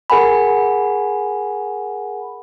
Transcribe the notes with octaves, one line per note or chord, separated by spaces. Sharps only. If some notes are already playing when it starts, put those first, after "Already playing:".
G#4 A#4 F#5 G#5 B5